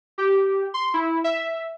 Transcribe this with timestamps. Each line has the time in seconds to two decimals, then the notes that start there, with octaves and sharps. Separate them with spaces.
0.18 G4
0.74 C6
0.94 E4
1.24 E5